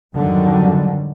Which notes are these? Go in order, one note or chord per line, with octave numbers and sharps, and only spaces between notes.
F2 G#2 D3 D#3 F#3 G3